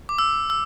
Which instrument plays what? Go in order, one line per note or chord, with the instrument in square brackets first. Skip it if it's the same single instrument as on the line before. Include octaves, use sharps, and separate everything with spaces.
[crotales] D6
E6
E6